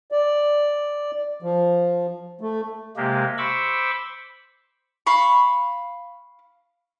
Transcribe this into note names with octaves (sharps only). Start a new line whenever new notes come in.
D5
F3
A3
C3 G#3 A#3 G4
C5 B5 C#6 D6 E6
F5 B5 C#6